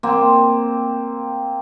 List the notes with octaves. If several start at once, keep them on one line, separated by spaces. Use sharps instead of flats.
A#3 C4